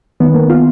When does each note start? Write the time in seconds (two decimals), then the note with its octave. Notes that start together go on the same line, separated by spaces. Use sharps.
0.20 D#3 B3
0.34 A#3
0.49 F4